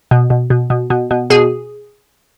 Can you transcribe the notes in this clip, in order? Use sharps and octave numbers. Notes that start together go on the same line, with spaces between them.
B2
B2
B2
B2
B2
B2
B2 G#4